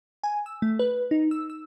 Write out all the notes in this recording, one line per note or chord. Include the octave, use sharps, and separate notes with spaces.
G#5
E6
A3
B4
D#4
E6
E6